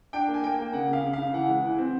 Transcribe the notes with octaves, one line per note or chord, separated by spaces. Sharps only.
D4 G5
A#3
G#5
A#3 G5
A#3
C#3 F#5
C#3 F5
C#3
F5
C#3
E3 F#5
G#3
E3
C4